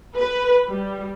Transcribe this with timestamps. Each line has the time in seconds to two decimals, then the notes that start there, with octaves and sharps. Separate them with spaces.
0.15 B4
0.69 G3